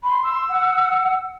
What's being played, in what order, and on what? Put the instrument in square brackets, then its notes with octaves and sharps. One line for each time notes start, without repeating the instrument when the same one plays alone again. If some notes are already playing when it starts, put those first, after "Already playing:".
[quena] B5 [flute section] C6
[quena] E6
[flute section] F#5